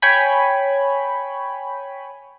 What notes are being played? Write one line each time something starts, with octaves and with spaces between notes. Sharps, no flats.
C#5 G5 G#5 B5